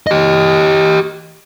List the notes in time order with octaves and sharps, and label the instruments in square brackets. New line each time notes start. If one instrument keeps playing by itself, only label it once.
[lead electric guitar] G4 D#5